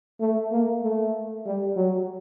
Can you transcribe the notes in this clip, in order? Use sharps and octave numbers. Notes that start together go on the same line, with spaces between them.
A3
A#3
A3
G3
F#3